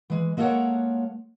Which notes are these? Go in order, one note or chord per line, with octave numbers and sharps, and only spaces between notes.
E3 G#3
G#3 A#3 A4 A#4 C#5 F#5